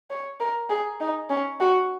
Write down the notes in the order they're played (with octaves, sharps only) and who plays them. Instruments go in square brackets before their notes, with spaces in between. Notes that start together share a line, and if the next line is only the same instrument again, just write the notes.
[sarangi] C#5
A#4
G#4
D#4
C#4
F#4